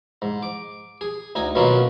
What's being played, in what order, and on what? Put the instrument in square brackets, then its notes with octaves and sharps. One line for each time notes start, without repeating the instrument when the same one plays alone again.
[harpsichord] G#2
D6
G#4
D2 D#4 G#5
B2 D#3 F#3 A#3 C#4 F4